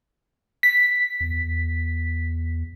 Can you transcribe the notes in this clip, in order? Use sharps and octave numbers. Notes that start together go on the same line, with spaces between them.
B6
E2